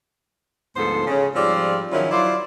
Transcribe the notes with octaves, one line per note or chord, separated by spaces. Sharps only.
D2 G#2 F3 B3 A4 C5
C#3
G#2 F3 G3 C4 D5
D#3 F3 F#3 C#4 E4
F#3 E4 F4 C5 D5